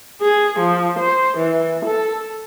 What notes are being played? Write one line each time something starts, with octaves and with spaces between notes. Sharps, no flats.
G#4
F3
C5
E3
A4